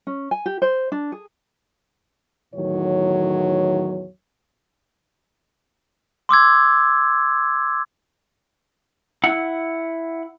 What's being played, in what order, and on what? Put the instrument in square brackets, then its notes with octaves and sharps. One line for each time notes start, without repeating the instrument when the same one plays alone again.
[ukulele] C#4
G#5
G4
C5
D4
G#4
[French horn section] E2 A2 D#3 F#3 C#5
[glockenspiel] C6 D6 E6 G#6
[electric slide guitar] E4 F#5